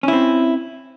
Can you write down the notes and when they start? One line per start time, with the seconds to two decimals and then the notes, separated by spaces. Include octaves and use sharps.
0.03 C#4
0.08 E4
0.13 C4